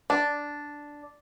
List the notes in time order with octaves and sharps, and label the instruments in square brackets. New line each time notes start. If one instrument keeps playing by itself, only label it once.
[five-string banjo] D4